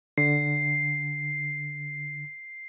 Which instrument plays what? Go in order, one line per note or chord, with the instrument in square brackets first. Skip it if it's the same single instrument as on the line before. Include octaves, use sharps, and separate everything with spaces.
[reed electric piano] D3 [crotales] C7